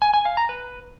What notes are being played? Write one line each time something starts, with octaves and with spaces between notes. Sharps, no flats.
G#5
G#5
F5
A#5
B4